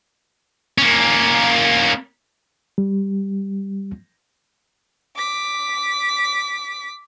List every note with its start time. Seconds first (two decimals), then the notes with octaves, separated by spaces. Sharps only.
0.78 A#3 C#4
2.78 G3
5.16 D6 B6